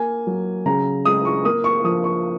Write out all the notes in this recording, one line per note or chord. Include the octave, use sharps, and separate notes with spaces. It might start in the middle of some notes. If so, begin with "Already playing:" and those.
Already playing: A#3 G#5
F#3
C#3 A#5
G#3 D#6
C#6
A#3 D#6
C#6
F3 D#6
C#6